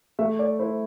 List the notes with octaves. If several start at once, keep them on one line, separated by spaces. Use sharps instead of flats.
A3 E5
D5
E4 C5